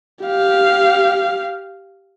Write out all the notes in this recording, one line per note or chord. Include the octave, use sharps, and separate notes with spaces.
G4 F5